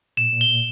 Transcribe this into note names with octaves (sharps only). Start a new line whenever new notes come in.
A#2 E7
A#2
G7
A#2